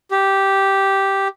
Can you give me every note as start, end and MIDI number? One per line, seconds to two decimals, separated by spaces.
0.11 1.28 67